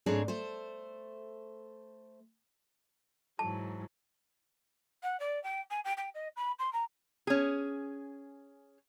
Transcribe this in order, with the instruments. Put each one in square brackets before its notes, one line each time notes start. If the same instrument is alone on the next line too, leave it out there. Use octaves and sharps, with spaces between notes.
[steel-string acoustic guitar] G#2 A3 C4 D4 G#4 C#5
A3 C5
[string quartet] G#2 E3 F#3 [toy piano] A5
[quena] F#5
D5
G5
G#5
G5
G5
D#5
B5
C6
A#5
[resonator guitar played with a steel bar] C#4 G#4